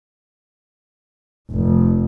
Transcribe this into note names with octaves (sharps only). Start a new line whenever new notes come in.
F1